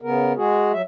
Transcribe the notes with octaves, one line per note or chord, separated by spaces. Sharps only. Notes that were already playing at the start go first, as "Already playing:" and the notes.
C#3 B3 A#4
G#3 F#4 G#4
F#3 E5